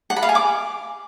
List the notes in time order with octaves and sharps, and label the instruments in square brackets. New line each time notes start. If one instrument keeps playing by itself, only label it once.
[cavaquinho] F#5
B5
F5
G#5
D6